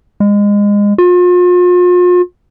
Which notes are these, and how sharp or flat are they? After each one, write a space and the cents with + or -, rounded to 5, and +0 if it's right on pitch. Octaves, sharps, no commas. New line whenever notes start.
G#3 -25
F4 +40